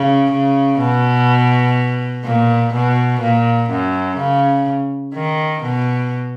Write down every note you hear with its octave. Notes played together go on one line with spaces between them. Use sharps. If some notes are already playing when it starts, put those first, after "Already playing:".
Already playing: C#3
C#3
B2
A#2
B2
A#2
F#2
C#3
D#3
B2